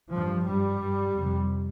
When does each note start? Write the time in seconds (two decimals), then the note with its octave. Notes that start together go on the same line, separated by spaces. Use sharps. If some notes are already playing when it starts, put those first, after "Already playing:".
0.12 G2 F3
0.46 G2 G3
0.81 G2
1.14 F2 C3